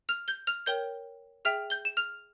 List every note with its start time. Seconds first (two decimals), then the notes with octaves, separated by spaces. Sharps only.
0.09 F6 F7
0.28 G6 G7
0.47 F6 F7
0.66 A#4 C#5 G5 G6 G7
1.45 G#4 E5 G5 F6 F7
1.70 G6 G7
1.85 E7
1.97 F6 F7